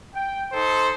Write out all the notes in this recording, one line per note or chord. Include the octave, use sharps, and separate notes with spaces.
G5
D#4 A4 C5